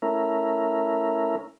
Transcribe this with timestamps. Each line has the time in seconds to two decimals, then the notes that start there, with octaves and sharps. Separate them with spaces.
0.02 A3 C#4 E4 A#4